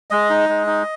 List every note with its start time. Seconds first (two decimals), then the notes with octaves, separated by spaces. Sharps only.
0.10 G#3 D#5
0.30 D#4
0.49 G#3
0.67 D#4